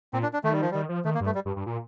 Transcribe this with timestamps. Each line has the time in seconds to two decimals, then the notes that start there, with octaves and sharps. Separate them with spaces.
0.13 A#2 C4
0.23 D4
0.34 D4
0.44 D#3 A3
0.52 G3
0.61 F3
0.71 D#3 G3
0.89 F3
1.05 D#3 A3
1.15 A#3
1.20 G2
1.26 A3
1.35 G3
1.45 G2
1.56 G2
1.66 A#2